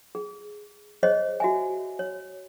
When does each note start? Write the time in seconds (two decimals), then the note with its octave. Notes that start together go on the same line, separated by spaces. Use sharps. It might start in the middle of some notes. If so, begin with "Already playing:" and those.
0.15 G#4
1.03 G#4 C5 C#5 D#5
1.40 F#4 E5 G#5
1.99 C#5